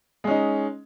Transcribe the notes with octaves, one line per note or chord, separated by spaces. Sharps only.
G#3 C#4 D#4